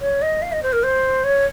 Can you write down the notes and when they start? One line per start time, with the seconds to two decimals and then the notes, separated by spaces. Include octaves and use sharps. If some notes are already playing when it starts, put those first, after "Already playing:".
0.01 C#5
0.22 D#5
0.42 F5
0.52 D#5
0.63 C5
0.73 A#4
0.83 C5
1.24 C#5